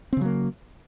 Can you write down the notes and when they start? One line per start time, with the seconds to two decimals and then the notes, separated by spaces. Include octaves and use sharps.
0.13 C4
0.17 C#3
0.21 F#3
0.25 A#3